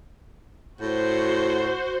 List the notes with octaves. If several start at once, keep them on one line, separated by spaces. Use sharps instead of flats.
A2 F#4 C5